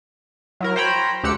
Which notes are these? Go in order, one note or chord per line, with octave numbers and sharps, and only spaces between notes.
F#3 E4 A#4
C5 C#5 G5 A#5 B5
D2 G4 F#5 E6 C#7